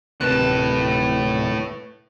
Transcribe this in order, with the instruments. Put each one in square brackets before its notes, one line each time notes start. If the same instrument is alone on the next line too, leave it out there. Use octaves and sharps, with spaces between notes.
[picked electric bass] D1 C3 D#3 [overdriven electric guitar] A2 A5 [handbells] B4 F#6